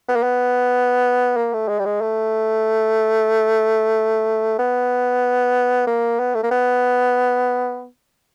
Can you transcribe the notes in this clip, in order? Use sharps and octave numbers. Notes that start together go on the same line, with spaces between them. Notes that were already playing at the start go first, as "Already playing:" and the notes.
B3
A#3
B3
A#3
A3
G#3
G3
G#3
A3
B3
A#3
B3
A3
A#3
B3